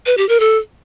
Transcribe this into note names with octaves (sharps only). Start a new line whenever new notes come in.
B4
G4
A#4
A4